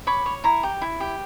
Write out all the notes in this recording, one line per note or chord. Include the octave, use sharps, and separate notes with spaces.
C#5 B5 D6
C#5
E4 A#5 C#6
G4
E4
G4